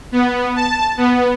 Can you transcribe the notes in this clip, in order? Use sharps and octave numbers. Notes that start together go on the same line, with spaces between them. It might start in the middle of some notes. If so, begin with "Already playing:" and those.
B3
A5
B3